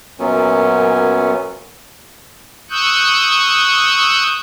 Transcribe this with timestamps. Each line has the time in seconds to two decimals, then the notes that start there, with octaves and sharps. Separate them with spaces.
0.19 F#2 A#2 F#3 B3 C#4
2.70 C#6 D#6 E6 F#6 G6